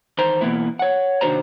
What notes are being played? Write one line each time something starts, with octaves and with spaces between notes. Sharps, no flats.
E2 D#3 C5 A#5
B2 E3 A#3 B3 E4
C#5 F#5
C3 D#3 D4 F#4 C5 A#5